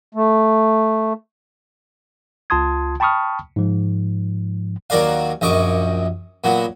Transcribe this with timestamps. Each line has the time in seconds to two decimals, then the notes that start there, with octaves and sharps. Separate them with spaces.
0.15 A3
2.50 C#2 F4 A5 C6 D#6 G#6
3.00 G5 A5 B5 C#6 D#6 F6
3.56 G#2 F3
4.90 D#2 F#3 A#4 D5 F5
5.41 A#1 F#2 D#5 C#6 D6
6.44 A#2 F#3 B3